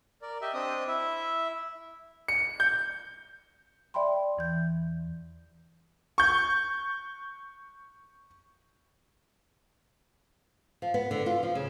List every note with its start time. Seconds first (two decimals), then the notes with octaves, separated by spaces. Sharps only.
0.22 A#4 D5
0.41 G4 D#5 E5
0.54 C4 D4 D#5 D#6
0.87 E4 E5
2.28 C#7
2.60 G6
3.94 D5 E5 G5 B5 C6
4.37 E2 E3 G6
6.18 C#6 G6
10.82 F3
10.94 B3
11.11 D3
11.26 F4
11.43 F3
11.55 C#3